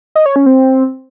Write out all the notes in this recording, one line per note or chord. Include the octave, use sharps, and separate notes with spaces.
D#5
C#5
C#4
C4